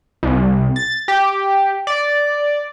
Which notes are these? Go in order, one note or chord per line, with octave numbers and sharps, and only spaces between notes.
C2
A6
G4
D5